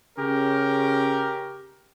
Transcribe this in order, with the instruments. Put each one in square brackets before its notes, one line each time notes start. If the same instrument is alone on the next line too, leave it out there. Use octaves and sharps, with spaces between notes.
[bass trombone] C#3 [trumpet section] C#4 G4 A#4